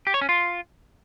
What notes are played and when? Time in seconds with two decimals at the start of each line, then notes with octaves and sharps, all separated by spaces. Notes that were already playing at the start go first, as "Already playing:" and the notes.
0.07 G4
0.14 C#5
0.21 C#4
0.29 F4